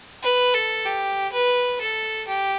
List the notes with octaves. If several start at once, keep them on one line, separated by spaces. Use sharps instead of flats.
B4
A4
G4
B4
A4
G4